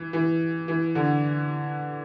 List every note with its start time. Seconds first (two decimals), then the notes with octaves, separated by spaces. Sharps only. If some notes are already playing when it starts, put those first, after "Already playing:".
Already playing: E3
0.13 E3
0.68 E3
0.95 D3